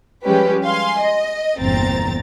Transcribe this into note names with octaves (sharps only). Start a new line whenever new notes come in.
F3 G3 G#3 C#4 G4 B4
F5 G#5 C6
D#5
G1 E2 A#2 C4 A#5 A6